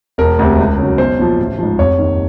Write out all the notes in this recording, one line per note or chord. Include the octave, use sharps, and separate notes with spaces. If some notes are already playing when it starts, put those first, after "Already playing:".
E1 A#4
D2 C3
C#2
C#3 F#3
B1 C5
A#2 F3
A1
G#2 F3
F1 C#5
D#2 D#3